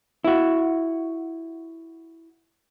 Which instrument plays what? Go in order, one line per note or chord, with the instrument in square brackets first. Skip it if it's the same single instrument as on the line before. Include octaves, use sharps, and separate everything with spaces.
[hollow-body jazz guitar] E4 F#4